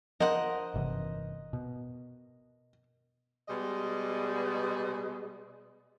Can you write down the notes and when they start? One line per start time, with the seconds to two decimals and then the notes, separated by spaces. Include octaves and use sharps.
0.20 F3 D4 A#4 C5 D#5 F#5
0.74 G1 C3 E3
1.53 B2
3.49 B2 G3 G#3 G#4 D#5